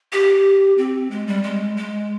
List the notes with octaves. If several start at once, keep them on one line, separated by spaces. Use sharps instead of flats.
G4
C4
G#3
G3
G#3
G#3